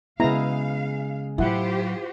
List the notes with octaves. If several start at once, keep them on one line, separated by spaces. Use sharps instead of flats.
C#3 G#3 B3 E4 F5 A#5
A2 F#3 E4 F4 G4 C5 F#5